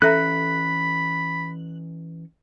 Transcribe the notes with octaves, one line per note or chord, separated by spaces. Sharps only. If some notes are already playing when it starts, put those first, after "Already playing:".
E3 C#4 A4 E5 A#5 B5 F#6